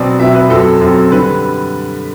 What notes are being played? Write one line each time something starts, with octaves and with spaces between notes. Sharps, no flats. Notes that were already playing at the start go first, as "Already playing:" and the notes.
Already playing: B2 F#3 C4 D5
B2 F#3 C4 E5
B4
F#2 F#3 C4 A4
F#2 F#3 C4
D3 G3 B4